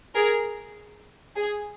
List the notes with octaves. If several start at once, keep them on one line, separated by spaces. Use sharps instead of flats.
G#4 A#4
G#4